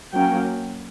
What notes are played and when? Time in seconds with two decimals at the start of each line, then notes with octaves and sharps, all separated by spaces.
0.13 F#3 A#3 C#4 G5